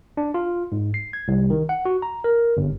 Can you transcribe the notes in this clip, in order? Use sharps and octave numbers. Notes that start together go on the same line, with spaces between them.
D4
F4
G#2
C7
G#6
C2
D#3
F#5
F#4
A#5
A#4
G1